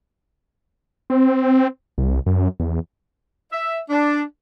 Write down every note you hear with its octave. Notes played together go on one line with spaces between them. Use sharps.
C4
C2
F#2
E2
E5
D4